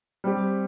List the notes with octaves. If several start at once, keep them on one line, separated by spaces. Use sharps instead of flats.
G3 C4 G4